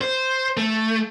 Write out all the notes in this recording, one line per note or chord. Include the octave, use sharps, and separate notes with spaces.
C5
A3